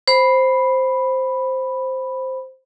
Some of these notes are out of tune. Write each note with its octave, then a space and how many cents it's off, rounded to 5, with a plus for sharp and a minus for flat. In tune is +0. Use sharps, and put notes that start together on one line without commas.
C5 +0 B5 +0